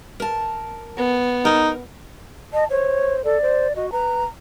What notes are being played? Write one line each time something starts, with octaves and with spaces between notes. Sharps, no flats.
A#4 A5
B3
D#4 A#4
D#5 A5
C5 C#5
A4 D5
C5
F#4 D#5
B4 A#5